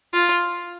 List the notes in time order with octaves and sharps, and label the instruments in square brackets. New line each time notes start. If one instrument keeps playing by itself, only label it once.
[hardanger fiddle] F4